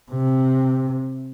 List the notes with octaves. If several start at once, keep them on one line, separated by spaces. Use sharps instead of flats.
C3